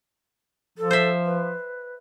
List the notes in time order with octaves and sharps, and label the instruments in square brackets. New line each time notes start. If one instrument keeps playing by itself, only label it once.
[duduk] F3 [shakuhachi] A4
[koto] C5 E5
[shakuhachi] B4